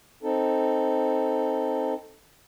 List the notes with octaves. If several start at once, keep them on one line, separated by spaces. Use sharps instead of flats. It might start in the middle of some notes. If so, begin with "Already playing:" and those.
C4 D#4 A4